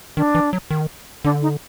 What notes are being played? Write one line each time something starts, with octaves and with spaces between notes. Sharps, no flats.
D#3 D4
E3
F#3
D#3
D3 D4
D#4